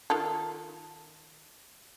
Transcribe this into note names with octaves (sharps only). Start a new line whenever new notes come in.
D#3 F4 A4